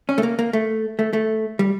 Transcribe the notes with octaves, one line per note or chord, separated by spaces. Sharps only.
C#4
A3
A#3
A#3
A3
A3
A3
G3